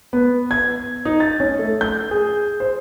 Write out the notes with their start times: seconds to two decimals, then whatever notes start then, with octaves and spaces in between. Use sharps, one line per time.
0.13 B3
0.51 G#6
1.05 D#4
1.20 A6
1.40 C#4
1.59 A3
1.81 G6
2.11 G#4
2.60 C5